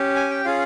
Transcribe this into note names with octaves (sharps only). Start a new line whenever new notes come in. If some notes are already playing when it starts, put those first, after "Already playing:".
Already playing: C#4 G4
G#5
G5
C#4 F4 G#4 F5